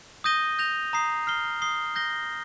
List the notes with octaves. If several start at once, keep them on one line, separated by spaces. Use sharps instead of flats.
D#6 G6 A#6 D#7 G7
G6 A#6 F7
A#5 D#6 C7
F6 C7 G7
D#6 C7 G7
G6 A#6 G7